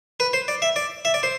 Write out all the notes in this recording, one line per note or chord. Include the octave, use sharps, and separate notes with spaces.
B4
C5
D5
E5
D5
E5
D5
C5